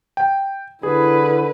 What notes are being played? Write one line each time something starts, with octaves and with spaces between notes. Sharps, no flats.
G5
D3 E4 G#4 B4